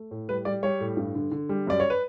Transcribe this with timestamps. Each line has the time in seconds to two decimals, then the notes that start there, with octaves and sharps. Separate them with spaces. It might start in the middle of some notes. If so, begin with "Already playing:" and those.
Already playing: A3
0.11 A2
0.29 G3 B4
0.45 G3 D5
0.63 G3 C#5
0.80 A2
0.97 G2
1.15 D3
1.31 D3
1.49 G3
1.67 F#2 D5
1.80 C#5
1.90 B4